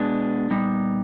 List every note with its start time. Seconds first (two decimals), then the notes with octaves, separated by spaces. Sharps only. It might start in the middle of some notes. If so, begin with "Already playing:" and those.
Already playing: B2 G#3 B3 D4
0.50 A#2 G3 B3 D#4